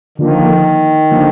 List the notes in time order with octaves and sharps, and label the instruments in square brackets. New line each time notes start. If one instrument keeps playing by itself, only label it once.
[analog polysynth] D3 F3 A#3 [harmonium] D#3
[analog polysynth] D3 F3 A#3